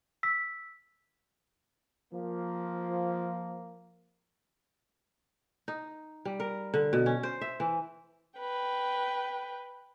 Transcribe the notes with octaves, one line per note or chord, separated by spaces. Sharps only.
E6 B6
F3 A#3
D#4
G3
A#4
D3
B2
C#4
C5
E5
E3
B4 G5